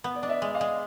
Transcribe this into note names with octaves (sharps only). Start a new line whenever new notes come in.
B3
D5
D4 D#5
D5 E5
G#3
D#5 F5
G#3